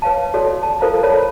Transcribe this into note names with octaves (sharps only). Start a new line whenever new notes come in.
B4 C#5 F5 A5
F#4 A4 C#5 D5
A5
F4 A4 A#4 C5 F5 A#5
A4 C#5 D5 A5 B5